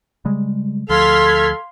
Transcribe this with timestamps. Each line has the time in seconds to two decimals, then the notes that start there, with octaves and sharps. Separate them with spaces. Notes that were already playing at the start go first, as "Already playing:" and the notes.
0.25 C#3 G3 G#3
0.89 D2 F3 A4 F5 C6 F6 G#6 B6